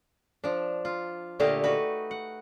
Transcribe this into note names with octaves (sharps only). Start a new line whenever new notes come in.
F3 D4
F4
A#2 D3 A3 G4 D#5 F5
D#4 F#4 B4
F#5